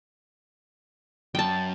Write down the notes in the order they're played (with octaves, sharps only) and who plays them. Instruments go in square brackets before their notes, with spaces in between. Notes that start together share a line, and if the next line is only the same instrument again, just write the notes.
[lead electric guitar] F#2 [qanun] G5 A5